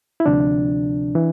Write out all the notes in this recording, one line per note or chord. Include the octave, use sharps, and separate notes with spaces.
E4
D2 C3 F3 D4
E3